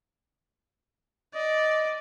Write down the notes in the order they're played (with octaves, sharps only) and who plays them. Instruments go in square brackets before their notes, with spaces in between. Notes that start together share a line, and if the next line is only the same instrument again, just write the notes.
[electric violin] D5 [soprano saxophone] D#5